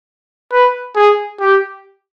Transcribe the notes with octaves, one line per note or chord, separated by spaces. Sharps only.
B4
G#4
G4